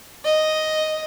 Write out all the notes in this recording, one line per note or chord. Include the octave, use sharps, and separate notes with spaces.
D#5